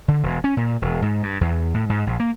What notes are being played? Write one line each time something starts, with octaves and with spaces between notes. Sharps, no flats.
D3
E1
C#4
A#2
E1
G#2
G2
E2
A2
G#2
A#1
A#3